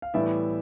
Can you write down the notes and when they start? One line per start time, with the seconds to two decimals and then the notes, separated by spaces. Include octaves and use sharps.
0.02 F5
0.14 A2 E3 G3 B3 D5 E5